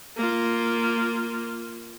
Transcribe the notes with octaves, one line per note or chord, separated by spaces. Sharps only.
A#3 F4